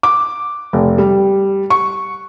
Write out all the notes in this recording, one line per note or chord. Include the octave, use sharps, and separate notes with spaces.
D6
F1
G3
C#6